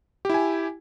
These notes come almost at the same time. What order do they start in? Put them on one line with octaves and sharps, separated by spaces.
G4 E4 G#5